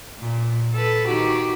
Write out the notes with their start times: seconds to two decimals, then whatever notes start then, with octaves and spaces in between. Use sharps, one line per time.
0.19 A#2
0.74 A4 B4
1.08 D#3 F#4 G4